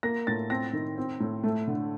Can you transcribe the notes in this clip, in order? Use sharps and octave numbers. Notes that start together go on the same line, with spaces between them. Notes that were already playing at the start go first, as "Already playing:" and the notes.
A#3 A#6
A2 A6
C4 A#6
D#3
C4
A2
A3
D3